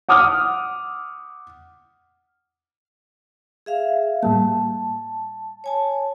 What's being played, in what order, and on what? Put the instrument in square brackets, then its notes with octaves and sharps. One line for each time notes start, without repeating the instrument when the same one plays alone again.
[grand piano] F#5 D6 D#6 F6
[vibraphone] G#4 E5 F5
[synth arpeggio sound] A2 G3 A#3 [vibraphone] A5
[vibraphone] C#5 G#5 A5